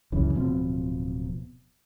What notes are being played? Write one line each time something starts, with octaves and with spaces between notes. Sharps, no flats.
C#2 F#2 C#3 E3
D1 B2 F3 C4